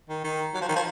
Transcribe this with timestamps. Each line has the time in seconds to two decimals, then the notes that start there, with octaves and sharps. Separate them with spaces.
0.09 D#3
0.24 D#3
0.54 F#3
0.61 F3
0.69 D#3
0.76 F3